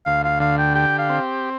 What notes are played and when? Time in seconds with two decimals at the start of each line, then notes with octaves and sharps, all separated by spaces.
0.06 D2 F5
0.24 F5
0.40 D3 F5
0.58 G5
0.75 G4 G5
0.98 F5
1.10 C4